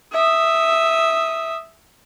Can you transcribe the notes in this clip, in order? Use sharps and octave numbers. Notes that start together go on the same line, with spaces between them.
E5 D#6